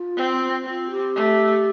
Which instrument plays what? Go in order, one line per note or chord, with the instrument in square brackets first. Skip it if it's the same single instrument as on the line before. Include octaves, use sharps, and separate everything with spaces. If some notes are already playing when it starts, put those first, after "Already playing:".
Already playing: [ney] F4
[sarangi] C4
[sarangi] C4 [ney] F4
[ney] G4
[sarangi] A3